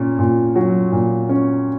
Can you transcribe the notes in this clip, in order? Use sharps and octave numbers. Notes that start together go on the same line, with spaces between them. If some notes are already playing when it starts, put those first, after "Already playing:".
Already playing: A#2 C#4
A#2
F#3
A#2
C#4